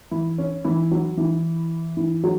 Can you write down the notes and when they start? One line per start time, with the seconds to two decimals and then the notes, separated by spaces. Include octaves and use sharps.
0.11 E3 E4
0.38 C#4
0.64 E3 E4
0.91 F#3 F#4
1.17 E3 E4
1.97 E3 E4
2.24 F#3 F#4